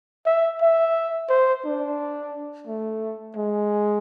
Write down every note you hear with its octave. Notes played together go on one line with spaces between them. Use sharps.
E5
E5
C5
D4
A3
G#3